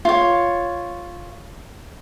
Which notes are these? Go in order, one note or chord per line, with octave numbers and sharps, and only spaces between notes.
F4 C#5